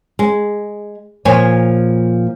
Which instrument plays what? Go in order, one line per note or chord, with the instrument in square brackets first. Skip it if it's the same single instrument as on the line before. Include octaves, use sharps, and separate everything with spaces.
[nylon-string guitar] G#3
A#2 F3 C#5 G#5